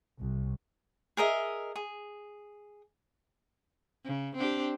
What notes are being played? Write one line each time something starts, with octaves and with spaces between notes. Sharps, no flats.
C2
G#4 A#4 D#5 E5
G#4
C#3
C4 D4 G4